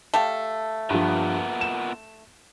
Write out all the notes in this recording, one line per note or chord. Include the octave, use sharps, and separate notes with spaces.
A3 G4 F5 A5
G2 A#2 F3 B3
E7